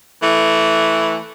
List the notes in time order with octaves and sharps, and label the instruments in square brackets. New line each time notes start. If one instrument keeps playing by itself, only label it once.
[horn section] E3 A3